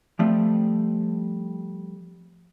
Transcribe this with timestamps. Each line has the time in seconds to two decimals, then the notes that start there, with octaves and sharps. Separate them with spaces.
0.19 F3 G3 A3 C4